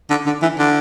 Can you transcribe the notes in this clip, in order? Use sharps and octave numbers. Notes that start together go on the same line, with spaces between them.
D3
D3
E3
D3